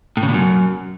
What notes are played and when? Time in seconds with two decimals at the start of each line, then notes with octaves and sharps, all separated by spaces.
0.17 A2
0.23 C#3
0.28 A#2
0.34 F#2